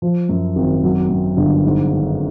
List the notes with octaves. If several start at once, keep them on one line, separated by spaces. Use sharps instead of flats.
F3
F#2
G#1
F#3
F#2
G1
G#2
D#3